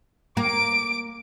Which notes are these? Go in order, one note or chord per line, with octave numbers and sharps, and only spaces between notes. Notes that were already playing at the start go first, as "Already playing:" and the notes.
A#3 D6 D7